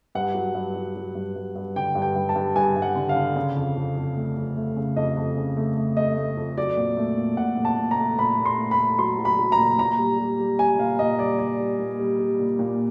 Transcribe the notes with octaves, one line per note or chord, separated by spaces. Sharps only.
G2 F#5
F#3
G2
F#3
F#3
G2
G2
G2
D3 G5
G2
G5
G2
A5
G2
G2 G#5
G2
F#5
D3
F5
D3
C#3
F2
F2
F2
A3
F2
A3
C#3
F2 D#5
F2
C#3
A3
A3
A3 D#5
A3
F2
F#3 D5
A#2
A3
A#2
A#2 F#5
A#2
A5
A#2
A#5
A3
A#2 B5
A#2
C6
A3
B5
A3
F#3 C6
F#3
B5
F#3
A#5
A#2
A#2 A#5
G3
G3
G3
G3 G#5
A#2 F5
A#2 D#5
G3 D5
G3 D5
G3
A#2
G3
G3
A#2
A#2